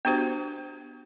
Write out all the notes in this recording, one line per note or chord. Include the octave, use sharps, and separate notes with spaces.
B3 D4 F#4 G4 C5